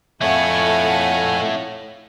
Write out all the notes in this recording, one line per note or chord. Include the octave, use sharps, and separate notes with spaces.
F2 A3 E4 A4 C#5 F5 F#5 G#5